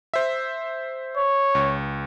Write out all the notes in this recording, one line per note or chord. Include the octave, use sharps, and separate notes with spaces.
C5 E5
C#5
C#2